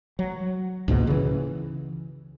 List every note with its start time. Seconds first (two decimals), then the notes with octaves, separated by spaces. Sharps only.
0.19 F#3
0.88 C#2 G#2 B2 A#3
1.07 C#3 E3